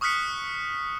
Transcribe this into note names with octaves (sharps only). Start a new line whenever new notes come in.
C#6 D#6 F6 F#6 B6 C#7